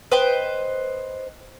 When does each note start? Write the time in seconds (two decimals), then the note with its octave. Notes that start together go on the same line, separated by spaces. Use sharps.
0.11 B4 C5 D#5 G5